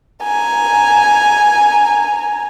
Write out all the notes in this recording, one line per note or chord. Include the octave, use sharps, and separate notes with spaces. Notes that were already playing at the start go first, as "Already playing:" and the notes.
G#5 A#5